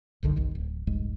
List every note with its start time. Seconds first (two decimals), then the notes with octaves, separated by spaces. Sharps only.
0.23 F#1 C2 D3 D#3
0.36 G1 C2 D#3
0.55 D1
0.87 F1 C2 G#2 G#3